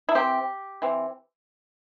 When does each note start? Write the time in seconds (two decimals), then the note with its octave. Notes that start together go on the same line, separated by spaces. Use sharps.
0.09 E4
0.15 E3 C4 G4
0.82 E3 C4